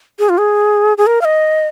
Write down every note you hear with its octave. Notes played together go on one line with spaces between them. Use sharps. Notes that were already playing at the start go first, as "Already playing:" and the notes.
G#4
F4
G#4
G#4
A#4
F5
D#5